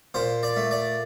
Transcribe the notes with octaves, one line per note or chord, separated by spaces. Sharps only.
A#2 C5
D5
A3
D5